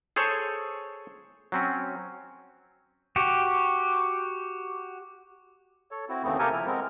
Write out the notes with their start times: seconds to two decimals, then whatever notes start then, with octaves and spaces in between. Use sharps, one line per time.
0.16 G#4 A4 C5 C#5 G#5
1.52 F#3 C4 C#4
3.16 F#4 G4
5.91 A4 C#5
6.09 C4 E4 F#4
6.23 D#2 C#3 E3 A3 B3 C4
6.39 C3 A#3 G4 A4 A#4 G#5
6.53 F3 E4 F6
6.67 G#3 B3 C4 A#4